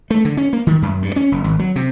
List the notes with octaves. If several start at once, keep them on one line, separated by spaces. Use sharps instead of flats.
A3
D3
C#4
A#3
D#3
F#2
G2
C#4
F#1
G#1
F#3
C3